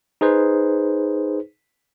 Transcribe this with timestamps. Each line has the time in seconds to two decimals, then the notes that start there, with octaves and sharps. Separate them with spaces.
0.21 D#4 G#4 B4 C5